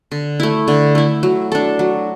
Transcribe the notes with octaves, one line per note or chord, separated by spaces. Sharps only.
D3
A3 E4
D3
A3 E4
F#3
D4 A4
F#3